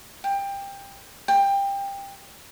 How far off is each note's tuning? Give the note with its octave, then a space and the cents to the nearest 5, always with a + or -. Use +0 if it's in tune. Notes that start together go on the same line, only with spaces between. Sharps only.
G5 +20
G5 +20